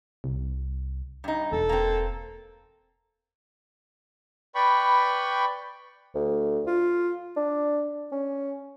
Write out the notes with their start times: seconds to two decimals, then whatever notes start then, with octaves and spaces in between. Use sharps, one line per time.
0.24 C2
1.24 G2 D#4
1.52 E1 A4
1.69 A#3 C4
4.55 B4 D5 G5 B5 C#6
6.15 D2
6.67 F4
7.36 D4
8.12 C#4